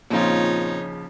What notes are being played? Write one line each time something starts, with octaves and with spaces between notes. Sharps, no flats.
A#1 A#2 C#3 F3 C4 D#4 F4 C#5